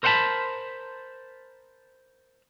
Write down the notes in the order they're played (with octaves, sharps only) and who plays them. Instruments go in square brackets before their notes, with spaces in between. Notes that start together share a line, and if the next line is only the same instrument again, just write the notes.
[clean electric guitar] A#4 C5 F5 F#5 A5 B5